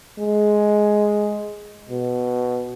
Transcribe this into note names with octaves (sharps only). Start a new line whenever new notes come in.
G#3
B2